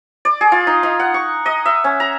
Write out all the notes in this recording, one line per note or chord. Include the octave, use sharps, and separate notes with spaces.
D5
G#4
F4
D#4
D#4
F#5
C#6
D#5
E5
C#4
A#5